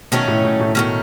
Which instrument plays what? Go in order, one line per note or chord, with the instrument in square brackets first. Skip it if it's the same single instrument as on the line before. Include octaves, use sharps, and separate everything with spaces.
[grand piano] B2 [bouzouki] D#3 F#3 A3 C#4
[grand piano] A2
A2
A2
[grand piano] B2 [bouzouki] D#3 F#3 A3 C#4